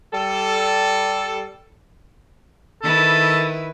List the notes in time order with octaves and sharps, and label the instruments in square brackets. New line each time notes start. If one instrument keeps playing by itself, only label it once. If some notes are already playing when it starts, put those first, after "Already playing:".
[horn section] G3 A4
[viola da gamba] D#3 E4 B4 [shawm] A4